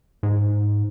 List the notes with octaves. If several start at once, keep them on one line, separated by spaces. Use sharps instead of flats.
G#2